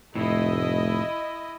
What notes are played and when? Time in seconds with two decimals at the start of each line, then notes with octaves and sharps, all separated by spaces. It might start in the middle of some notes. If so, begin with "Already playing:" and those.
0.15 F1 A2 E4 D#5